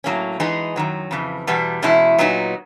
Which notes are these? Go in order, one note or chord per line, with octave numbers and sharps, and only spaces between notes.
A2 F#3 A#3 C#4
E3 G#3 B3 D#4 G#4
F#2 D#3 F#3
F2 C#3 E3
E2 B2 G3 B3
E2 B2 G#3 C#4 E4
A#2 F#3 B3 D#4